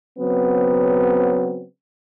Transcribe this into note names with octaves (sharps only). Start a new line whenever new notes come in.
C#3 F#3 B3 C4